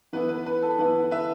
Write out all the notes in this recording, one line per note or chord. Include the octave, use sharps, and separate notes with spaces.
E3 B3 E4 B4
B4
B4
A4
E3 B3 E4 B4
B4 E5